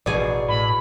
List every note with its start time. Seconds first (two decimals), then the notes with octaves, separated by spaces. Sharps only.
0.06 A1 B2 G#4 D5
0.48 A2 B5